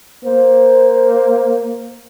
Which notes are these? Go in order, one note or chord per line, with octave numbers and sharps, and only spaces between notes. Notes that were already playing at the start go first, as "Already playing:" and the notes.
A#3 C5